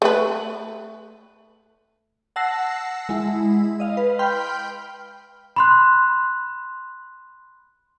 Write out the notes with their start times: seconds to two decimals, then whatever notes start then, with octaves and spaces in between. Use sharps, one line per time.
0.02 A3 B4
2.36 F#5 A5 E6 A#6 C7
3.09 G#3 E4
3.80 D#5 F5
3.97 B4
4.19 G5 B5 C6 F6 G6
5.56 B5 C6 F#6